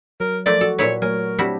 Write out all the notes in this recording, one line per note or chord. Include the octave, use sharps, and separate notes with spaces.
F#3 A#4
F3 A3 A#3 D5
F#4 A4
A#2 E4 B4 C#5
F#3 A3 A#4 C#5 G#5
G3 C4 D4 E4 F#4 G4